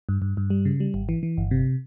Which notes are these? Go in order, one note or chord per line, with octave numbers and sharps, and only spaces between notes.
G2
G2
G2
G3
C#3
G3
G#1
E3
E3
G1
C3